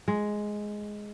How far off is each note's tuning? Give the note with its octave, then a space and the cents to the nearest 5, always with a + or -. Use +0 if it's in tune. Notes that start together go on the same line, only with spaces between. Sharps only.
G#3 +5